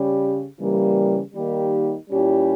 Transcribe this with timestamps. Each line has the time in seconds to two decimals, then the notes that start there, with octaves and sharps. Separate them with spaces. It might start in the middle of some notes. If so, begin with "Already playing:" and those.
Already playing: C#3 G3 C#4 G4
0.59 C#3 E3 G3 A#3
1.34 D#3 G3 A#3 D#4 G4
2.10 A#2 G3 C#4 E4 G4